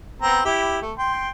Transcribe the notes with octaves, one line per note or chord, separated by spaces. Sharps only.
B3 C4 A#5
E4 G4
A3
G5 C6